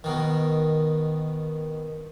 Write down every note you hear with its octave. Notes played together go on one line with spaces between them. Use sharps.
B2 D#3